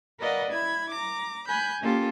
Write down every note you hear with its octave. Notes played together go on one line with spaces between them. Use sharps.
A#4 B4 D5 D#5 F5 F#5
E4 B5 G#6
A#5 D6
G#5 B5 F#6 G6
A#3 C#4 F4 G4 A4